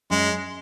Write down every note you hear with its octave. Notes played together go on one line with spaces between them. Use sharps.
F#2 G#3